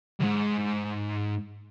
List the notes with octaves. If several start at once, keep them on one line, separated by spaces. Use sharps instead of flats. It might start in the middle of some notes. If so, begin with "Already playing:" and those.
C2 G#2